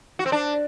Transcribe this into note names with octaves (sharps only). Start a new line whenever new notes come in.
F#4
C4
D4